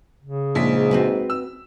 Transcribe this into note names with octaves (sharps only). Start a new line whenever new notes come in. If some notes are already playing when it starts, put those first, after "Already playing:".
C#3
A#1 G#2 B6
C4 F#4 B4
E6